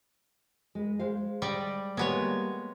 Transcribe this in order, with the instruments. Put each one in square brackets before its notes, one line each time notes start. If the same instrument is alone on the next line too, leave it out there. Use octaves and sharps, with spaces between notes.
[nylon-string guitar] G#3 B4
G#3 C5 F5
[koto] G3 D5 D#5
[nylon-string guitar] G3 A#3 [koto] G#3 B3 C#5